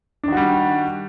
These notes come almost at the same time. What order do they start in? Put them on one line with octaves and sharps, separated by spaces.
D4 D#3 F#4 G3